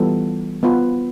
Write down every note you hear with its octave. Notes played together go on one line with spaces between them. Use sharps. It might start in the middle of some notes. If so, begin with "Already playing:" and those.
Already playing: E3 G3 B3 F4 A4
B3 F4 B4